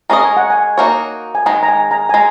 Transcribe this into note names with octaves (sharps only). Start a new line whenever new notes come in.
G#3 C#4 A#4 D#5 A#5
G#5
F#5
G#5
A#3 D#4 F#4 A#4 C#5
G#5
D#3 G#3 A#5
A#5
G#5
A#5
G#5
G#3 A#5